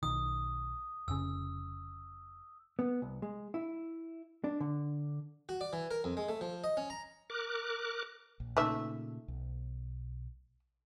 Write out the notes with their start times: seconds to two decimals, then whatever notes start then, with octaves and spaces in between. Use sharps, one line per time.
0.03 B1 D#3 D#6
1.08 F1 C#3 E6
2.79 B3
3.02 C2
3.22 G#3
3.54 E4
4.44 D4
4.60 D3
5.49 F#4
5.61 D5
5.73 E3
5.91 A#4
6.04 F2
6.17 G#3
6.29 A3
6.41 F3
6.64 D#5
6.77 C#4
6.90 A#5
7.30 A#4 D6 F#6
8.40 A#1
8.57 A#2 C#3 A3 D#4 E5
9.28 B1